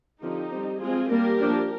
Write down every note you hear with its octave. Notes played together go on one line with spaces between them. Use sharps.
D3 F3 C4 D#4 G4
G3 C4
F3 G#3 C4 F4 G#4
G3 A#3 D4 G4 A#4
F3 A#3 D4